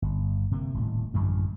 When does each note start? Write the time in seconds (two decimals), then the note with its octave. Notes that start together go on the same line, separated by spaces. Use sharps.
0.02 G1
0.51 C3 A#3
0.74 D#1 A2
1.14 A1 F#2 D3 G#3